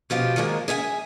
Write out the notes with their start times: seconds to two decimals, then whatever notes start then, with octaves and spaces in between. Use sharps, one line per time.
0.10 B2 F3 F4 G4
0.36 D#3 F3 G#3 A#3
0.68 G#4 E5 F5 G#5